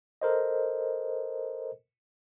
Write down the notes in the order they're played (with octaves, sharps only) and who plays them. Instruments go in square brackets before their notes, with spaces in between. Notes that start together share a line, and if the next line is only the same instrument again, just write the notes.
[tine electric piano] A4 A#4 C5 D#5